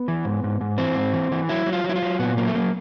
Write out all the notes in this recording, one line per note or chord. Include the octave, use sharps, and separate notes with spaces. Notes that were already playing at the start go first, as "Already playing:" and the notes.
Already playing: B3
E3
G#2
G#2
G#2
E3 C4
G#2
E3
E3
F#3 E4
F#3
F4
F#3
E4
F4
F#3
A#2 B3
F#3 A#3
A3
F#3 A#3